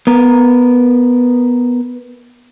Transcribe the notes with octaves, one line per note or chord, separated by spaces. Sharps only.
B3 A#4